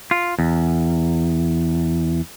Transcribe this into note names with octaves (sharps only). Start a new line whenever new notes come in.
F4
E2